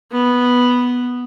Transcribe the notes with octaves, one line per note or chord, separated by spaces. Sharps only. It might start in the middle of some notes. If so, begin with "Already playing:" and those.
B3